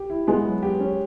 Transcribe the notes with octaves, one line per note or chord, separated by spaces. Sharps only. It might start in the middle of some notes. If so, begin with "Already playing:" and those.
Already playing: G4
E4
G#3 B3
F#3
G4
C#4